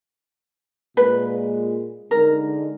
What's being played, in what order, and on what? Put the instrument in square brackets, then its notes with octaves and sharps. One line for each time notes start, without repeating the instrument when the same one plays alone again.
[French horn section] A#2 G#3 [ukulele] B4
[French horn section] D3 G#3 D#4 [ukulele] A#4